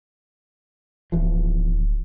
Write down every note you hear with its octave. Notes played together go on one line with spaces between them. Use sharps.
D1 E2 E3 F3